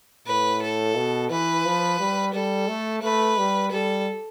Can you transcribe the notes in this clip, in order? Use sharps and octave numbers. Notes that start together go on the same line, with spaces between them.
A2 B4
A4
B2
E3 B4
F3
G3
G3 A4
A3
A3 B4
G3
G3 A4